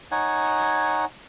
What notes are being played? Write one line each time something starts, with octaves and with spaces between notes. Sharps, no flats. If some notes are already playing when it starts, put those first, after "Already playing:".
D#4 C#5 F#5 G#5